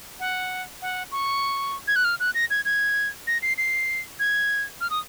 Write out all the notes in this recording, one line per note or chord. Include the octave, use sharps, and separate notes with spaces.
F#5
F#5
C#6
G#6
F#6
F6
F#6
A#6
G#6
G#6
A#6
C7
C7
G#6
F6
D#6